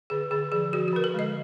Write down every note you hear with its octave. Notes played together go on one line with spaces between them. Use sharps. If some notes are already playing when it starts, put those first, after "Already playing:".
D3 G#4
D3 G#4
F3 G#4
F3 F#4
F#4
D3 A#4
A4
G#3 D#5